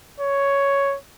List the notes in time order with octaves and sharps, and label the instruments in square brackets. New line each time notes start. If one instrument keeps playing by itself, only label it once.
[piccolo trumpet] C#5